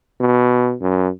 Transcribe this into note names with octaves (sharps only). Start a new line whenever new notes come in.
B2
F#2